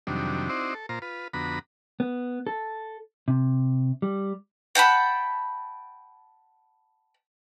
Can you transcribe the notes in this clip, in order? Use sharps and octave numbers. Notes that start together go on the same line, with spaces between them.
F2 C3 D#3 F#3 G3 D4
C4 D#4 E4 F#4 C5 D5
A4
A#2 F4 C5 A#5
F4 B4
F2 D3 B3 F#4 A#5 B5
B3
A4
C3
G3
F#5 G5 A5 B5